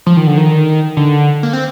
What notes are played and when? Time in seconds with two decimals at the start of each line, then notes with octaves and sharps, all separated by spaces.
0.06 F3
0.17 D#3
0.27 D3
0.37 D#3
0.97 D3
1.43 A#3
1.53 C4